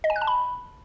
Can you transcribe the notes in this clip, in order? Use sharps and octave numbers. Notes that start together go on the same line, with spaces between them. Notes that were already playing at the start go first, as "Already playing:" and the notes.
D#5
G#5
F#6
A5
B5